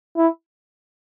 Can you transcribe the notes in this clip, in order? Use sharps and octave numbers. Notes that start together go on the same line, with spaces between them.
E4